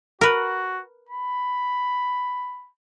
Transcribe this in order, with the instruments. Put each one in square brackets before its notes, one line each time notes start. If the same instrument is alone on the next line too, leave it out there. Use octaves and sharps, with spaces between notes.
[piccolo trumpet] F#4 [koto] A#4 B4
[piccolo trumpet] B5